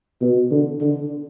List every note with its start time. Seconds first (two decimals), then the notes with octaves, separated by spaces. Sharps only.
0.21 B2
0.51 D3
0.81 D3